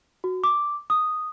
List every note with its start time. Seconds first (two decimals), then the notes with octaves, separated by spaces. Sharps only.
0.24 F#4
0.44 D6
0.90 D#6